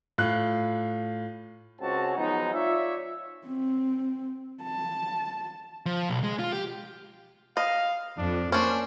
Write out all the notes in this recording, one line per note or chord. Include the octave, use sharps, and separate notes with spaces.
A2 F4 F#6
C#2 C4 C#4 F#4 C#5 A5
F3 F#3 G#3 B3 D#4
F4 C#5 D5 E5
C4
A5
F3
B1
G#3
F4
G4
D#5 F5
F2 D4
A#3 C#4 D4 C5